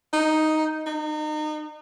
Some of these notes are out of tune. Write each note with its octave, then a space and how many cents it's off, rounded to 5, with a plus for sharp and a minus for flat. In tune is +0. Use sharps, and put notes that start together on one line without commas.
D#4 +5
D#4 -30